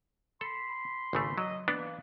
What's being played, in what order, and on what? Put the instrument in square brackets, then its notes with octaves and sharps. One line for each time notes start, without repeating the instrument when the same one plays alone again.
[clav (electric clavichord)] A4 [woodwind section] B5 C6
[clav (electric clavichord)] G#1 C#3 A3
[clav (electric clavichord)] F#3 [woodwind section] D#5
[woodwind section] E3 A#3 [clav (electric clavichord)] B3 D4